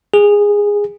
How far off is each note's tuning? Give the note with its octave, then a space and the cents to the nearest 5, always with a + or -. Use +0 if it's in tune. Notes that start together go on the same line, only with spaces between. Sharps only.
G#4 -15